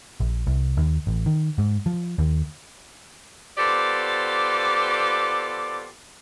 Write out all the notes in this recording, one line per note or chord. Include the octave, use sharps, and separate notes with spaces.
A#1
C2
D#2
A1
D#3
G#2
F3
D#2
B3 F4 G4 A4 C5 D5